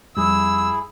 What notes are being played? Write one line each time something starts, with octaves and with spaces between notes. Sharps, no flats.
F2 G3 E4 G#4 E6